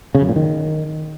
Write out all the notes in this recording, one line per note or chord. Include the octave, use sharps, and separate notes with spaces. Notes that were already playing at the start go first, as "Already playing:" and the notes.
C#3
F#2
A#2
D#3